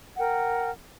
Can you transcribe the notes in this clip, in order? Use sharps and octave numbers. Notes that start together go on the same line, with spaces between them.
A#4 F#5 G5